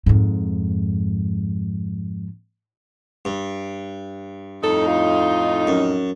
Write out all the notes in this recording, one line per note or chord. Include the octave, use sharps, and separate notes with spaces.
F2 G#2
G2
F2 A2 D#4 A4
F4
F#2